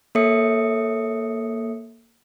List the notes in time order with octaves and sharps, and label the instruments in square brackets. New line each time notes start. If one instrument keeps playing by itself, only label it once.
[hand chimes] A#3 A4 C#5 E5 D#6 C#7